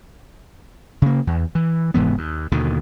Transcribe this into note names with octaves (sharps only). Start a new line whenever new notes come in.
C#3 A#3
E2
E3
F1 G#2 E3 B3
D#2
D#2 B2 D3 D#3